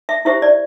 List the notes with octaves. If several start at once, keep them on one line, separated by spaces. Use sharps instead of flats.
E5
E4 G4 C5 E5
D5